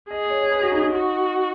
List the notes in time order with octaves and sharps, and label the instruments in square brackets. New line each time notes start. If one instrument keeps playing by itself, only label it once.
[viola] G#4 [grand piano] D#5
[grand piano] C#5
C#5
B4
F#4
D#4
D#4
[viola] F#4